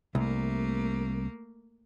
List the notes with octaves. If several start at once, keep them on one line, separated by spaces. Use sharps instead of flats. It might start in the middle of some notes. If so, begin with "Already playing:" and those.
C2 A3 A#3